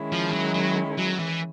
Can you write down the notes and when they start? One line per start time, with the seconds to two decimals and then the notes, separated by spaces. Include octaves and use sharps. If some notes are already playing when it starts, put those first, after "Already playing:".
Already playing: D#3 G#3 C#4 E4
0.13 F3
0.33 F#3
0.55 F#3
0.98 F#3
1.20 E3